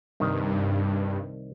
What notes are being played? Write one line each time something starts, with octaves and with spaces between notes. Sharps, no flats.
C2 G2 D#3